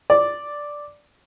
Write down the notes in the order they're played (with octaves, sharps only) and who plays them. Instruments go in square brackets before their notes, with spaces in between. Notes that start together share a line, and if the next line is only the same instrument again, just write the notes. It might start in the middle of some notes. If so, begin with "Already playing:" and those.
[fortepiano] D5